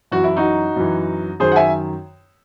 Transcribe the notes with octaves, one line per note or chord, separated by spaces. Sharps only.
F#2 E3 F#4
E4
D#4 F#4
F#2 E3
F#2 D#3 G#4 C5
F#5
E5 G#5